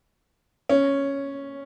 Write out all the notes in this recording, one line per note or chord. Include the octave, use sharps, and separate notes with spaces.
C#4